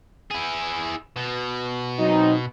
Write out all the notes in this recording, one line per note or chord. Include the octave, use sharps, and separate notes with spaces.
E4 G#4
B2
F#3 C4 D#4